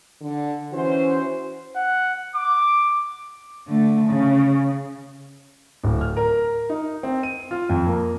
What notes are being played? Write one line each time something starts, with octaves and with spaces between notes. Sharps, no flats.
D3
E3 C#4 F#4 C5
F#5
D6
D3 A3
C#3
D1
F6
A#4
D#4
C4
D#7
F4
F2
A#3